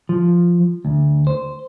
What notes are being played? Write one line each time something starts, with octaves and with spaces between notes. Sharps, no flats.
F3
D2
C5